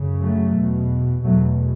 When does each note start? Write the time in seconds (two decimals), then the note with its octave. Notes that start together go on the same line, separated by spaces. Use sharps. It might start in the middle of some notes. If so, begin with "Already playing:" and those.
Already playing: F#2 C#3
0.19 F#3 A3
0.53 E2 B2
1.23 E2 B2 F#3 A3